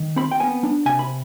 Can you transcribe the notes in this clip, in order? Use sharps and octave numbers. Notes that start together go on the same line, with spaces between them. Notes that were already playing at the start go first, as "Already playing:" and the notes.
Already playing: D#3
C4 B5
G5
B3 G#5
D4
C3 G#5
B5